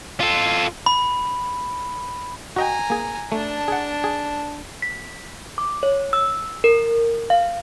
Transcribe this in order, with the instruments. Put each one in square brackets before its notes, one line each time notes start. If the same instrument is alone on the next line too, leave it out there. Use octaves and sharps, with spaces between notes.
[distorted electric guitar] F4 A4
[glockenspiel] B5
[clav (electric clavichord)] F#4 D#5 G5 [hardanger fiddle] G#5 A#5
[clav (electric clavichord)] A#3 G#4
[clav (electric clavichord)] A3 [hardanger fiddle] D4 A5
[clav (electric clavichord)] G#4 F#5
G#4
[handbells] B6
D6
C#5
E6
A#4
F5